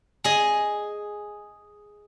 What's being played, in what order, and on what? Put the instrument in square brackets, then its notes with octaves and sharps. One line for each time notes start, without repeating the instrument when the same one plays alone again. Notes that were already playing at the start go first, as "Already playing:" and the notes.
[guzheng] G#4 D#5